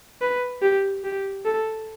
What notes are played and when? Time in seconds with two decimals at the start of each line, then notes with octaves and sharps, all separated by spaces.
0.22 B4
0.62 G4
1.04 G4
1.45 A4